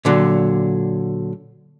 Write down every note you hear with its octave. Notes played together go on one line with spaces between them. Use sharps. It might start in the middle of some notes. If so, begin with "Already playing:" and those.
A#2 D3 F#3